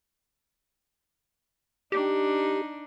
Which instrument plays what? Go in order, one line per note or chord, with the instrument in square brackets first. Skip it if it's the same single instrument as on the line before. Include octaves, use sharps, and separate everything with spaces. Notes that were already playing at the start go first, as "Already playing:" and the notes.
[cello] D4 D#4 [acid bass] G4